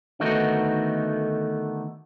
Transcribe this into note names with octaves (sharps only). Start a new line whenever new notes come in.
D3 D#3 A3 B3 D#4 F#4